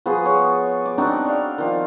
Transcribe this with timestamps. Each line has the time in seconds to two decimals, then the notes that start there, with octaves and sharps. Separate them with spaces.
0.06 F3 B3 F#4 G#4
0.26 C#5
0.86 D6
0.98 C4 D4 D#4 F#4
1.25 D5 F5
1.58 D#3 F3